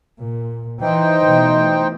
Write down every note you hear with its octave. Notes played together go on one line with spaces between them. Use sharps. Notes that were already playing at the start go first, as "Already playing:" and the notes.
A#2
E3 D#4 C5 D#5 G5
B2 E3 A3